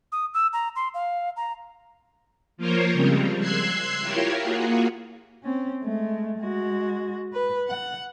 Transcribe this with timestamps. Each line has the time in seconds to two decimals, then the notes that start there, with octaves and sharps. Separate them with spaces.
0.12 D#6
0.34 E6
0.53 A#5
0.76 C6
0.94 F5
1.37 A#5
2.57 F3 A#3 F4 A#4 C5 C#5
2.92 C#3 F3 G3 G#3 C4
3.40 C6 E6 F#6 G#6 C7
4.01 E4 F4 G4 A#4 C#5
4.41 A#3 F4 F#4 G#4
5.44 C4 C#4
5.83 G#3 A3
6.38 G#3 F#4
7.33 B4
7.68 F#5